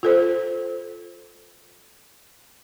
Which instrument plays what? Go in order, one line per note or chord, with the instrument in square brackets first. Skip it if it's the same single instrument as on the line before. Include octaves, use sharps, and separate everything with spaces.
[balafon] F4 A4 C5